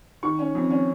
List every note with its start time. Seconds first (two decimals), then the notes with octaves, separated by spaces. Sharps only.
0.23 D#3 C#6
0.39 C#4
0.55 F2
0.71 C#4